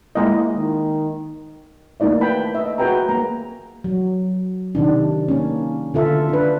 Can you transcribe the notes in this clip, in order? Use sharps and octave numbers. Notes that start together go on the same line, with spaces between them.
G#3 A#3 E4 D#5
D#3
A3 A#3 D#4 E4 D5 E5
B4 G5 A5 B5
D#5 E5
F#4 G#4 B4 G5 G#5 A#5
A#3 A#5
F#3
C3 D#3 D4
A#3 C#4
D3 F4 A4 E5
D4 B4